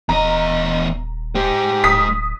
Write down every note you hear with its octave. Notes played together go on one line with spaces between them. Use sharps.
D#1 E2 D#5 A#5
G#3 G4 C5
D1 D#6 B6